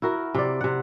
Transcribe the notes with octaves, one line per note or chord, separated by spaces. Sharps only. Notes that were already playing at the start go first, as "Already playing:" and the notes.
E4 F#4 A#4
C3 D5
C3 F#5